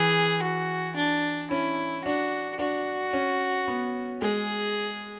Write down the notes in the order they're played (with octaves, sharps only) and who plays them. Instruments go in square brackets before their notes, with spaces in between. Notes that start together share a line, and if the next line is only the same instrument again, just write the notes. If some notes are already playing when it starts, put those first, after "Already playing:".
Already playing: [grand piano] E3 [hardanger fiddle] G#4
[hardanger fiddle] F#4
D4
[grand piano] C#4 [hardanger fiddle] E4
[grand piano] D4 [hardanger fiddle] F#4
[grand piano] D4 [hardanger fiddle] F#4
[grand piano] C#4
B3
[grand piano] G#3 [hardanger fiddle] G#4